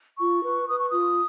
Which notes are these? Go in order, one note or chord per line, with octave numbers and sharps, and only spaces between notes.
F4 C#6
B4
B4 D#6
C#6
F4 D#6